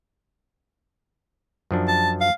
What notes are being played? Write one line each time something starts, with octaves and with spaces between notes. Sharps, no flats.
F#2 F3 D4
A5
F5